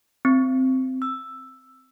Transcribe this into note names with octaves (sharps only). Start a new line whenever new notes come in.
C4
E6